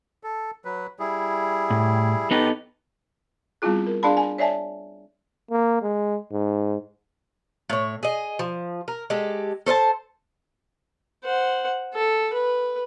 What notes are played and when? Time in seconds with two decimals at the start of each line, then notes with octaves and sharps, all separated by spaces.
0.23 A4
0.65 F#3 B4
0.99 G3 E4 G#4
1.70 A2
2.31 B3 D#4 G4 A4 B4
3.62 G3 B3 C4 E4 F4 G#4
3.87 A#4
4.03 D4 G#4 D5 F5 A5 B5
4.17 G#5
4.38 C#5 D5 E5 G#5 A5
5.51 A#3
5.82 G#3
6.32 G#2
7.70 A2 C#5
8.03 G#4 D#5
8.39 F3
8.88 A#4
9.10 G#3 G4 A4
9.66 A4 C5 E5 A5
11.24 C5 F#5
11.94 A4
12.33 B4